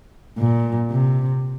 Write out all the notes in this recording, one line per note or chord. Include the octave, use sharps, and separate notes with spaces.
A#2
C3